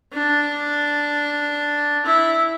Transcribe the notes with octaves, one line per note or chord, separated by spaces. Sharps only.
D4
E4